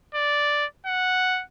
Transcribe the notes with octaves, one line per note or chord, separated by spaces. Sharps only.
D5
F#5